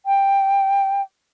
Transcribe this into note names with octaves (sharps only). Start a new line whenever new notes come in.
G5